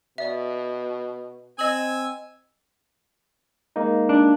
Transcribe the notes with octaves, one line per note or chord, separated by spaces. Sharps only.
B2 D5 E5
C4 D#5 G#5 E6 F#7
G#3 A#3 D#4
D4